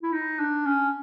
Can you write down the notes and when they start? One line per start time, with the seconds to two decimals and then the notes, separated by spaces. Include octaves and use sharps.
0.03 E4
0.13 D#4
0.40 D4
0.66 C#4